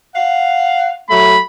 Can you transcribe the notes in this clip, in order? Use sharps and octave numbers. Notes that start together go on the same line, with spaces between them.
F5 F#5
F#3 A3 B5